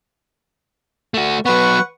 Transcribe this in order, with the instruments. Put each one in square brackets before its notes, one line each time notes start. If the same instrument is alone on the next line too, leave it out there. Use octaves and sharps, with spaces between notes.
[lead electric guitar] A3 F#4
[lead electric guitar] F#3 B3 [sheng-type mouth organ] B4 F#5 C#6